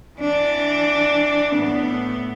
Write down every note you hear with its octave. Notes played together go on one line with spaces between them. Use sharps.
E3 D4
A2 B3